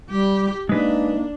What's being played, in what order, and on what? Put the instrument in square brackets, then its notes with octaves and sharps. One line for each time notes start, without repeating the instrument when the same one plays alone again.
[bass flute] G3 [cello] G4
[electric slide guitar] G#3 B4 [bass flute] A#3 [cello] D4 [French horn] D#4